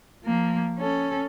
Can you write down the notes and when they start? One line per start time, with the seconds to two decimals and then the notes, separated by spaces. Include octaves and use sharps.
0.23 F3 A#3
0.79 C#4 A4